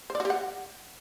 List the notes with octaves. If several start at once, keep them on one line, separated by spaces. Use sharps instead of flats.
C5
D5
F#4
G4
F#5